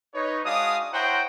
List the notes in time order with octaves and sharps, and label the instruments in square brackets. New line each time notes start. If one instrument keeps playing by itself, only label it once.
[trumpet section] D#4 B4 C#5
G#3 D4 F#4 F5 D#6
E4 C5 C#5 F#5 G5 A#5